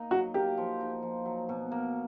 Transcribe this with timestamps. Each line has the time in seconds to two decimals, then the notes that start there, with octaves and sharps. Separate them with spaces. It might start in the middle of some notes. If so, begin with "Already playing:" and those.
Already playing: A#3 D#4
0.11 F#3 F#4
0.34 A#3 G4
0.57 F3
0.80 D#4
1.03 F3
1.25 F#3
1.49 B2
1.71 A#3